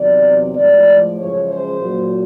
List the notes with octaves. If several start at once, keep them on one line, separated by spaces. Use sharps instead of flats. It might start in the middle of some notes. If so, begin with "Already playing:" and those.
Already playing: E2 C3 D#3 F#3 D5
A2 F3 G#3 D5
F#2 C#3 F3 G#3 C#5
C5
A#2 F#3